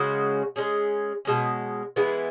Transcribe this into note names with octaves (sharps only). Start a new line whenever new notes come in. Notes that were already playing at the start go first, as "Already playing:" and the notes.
Already playing: C#3 G#3 C#4 F#4
G#3 C#4 G#4
B2 G#3 C#4
E3 G#3 B3 E4